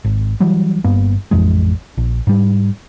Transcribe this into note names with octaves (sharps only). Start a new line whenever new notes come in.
G#1
E3 F#3 G3
G1 G2 A#3 B3
A1 F2 E3 G#3
A#1
G#2 G3